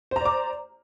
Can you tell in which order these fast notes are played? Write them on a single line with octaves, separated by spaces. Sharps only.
C5 A#5 D5 D6